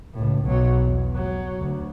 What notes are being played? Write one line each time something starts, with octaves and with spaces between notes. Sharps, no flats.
C#2 A2
B1 F#3
E2
F#3
D2